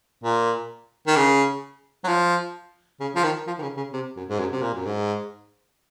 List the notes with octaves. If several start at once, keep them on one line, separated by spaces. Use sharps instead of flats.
A#2
D#3
C#3
F#3
F3
C#3
F3
D#3
F3
D#3
C#3
C#3
C3
F#2
G#2
F#2
C3
A#2
F#2
G#2